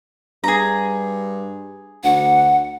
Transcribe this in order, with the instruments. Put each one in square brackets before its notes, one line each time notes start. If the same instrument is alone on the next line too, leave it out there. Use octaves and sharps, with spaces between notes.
[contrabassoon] G2 [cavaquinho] G#4 A#5
[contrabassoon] D2 [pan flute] F#5